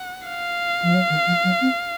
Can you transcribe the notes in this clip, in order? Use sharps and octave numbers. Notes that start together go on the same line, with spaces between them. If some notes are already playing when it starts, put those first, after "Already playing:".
Already playing: F#5
F5
F3
F#3
D#3
F3
F#3
C4